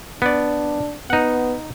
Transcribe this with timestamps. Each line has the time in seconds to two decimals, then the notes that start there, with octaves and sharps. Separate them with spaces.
0.22 B3 D4 D5
1.10 B3 D#4 F#5